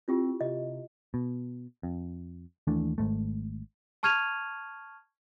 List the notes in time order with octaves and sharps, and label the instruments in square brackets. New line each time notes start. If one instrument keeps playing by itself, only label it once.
[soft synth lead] C4 [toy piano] E4 F4 G4
[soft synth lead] C3 [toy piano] D#5
[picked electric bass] B2
F2
D#2 E3 A3 D4
G#1 G#2 A3
[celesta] A5 C#6 F6 G#6 D#7 F7